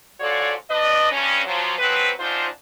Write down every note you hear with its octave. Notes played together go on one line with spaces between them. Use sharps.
G#2 F4 F#4 A4 C#5 D5
D4 B4 D5 D#5
G2 C#4
F3 F#3
F3 F#3 G#3 C4 B4
F#2 D4 D#4 F4 C5